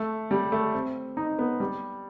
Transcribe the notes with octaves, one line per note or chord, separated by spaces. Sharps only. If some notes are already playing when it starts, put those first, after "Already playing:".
Already playing: A3
G3
A3
C4
D#4
B3
G3